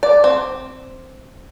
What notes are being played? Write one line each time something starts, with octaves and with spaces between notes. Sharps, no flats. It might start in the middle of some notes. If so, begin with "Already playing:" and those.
D5
C4